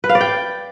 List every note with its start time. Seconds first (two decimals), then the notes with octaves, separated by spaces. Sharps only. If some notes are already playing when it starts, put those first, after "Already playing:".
0.04 B4
0.09 F5
0.15 D5
0.21 G5